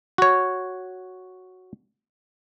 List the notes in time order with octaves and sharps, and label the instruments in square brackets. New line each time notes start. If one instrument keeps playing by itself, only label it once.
[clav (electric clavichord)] F#4 C#5